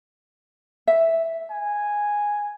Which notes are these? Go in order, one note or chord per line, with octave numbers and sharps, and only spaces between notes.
E5
G#5